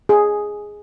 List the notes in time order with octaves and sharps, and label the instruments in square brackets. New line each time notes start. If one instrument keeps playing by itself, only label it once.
[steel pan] G#4